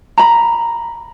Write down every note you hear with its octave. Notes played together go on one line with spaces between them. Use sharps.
A#5 B5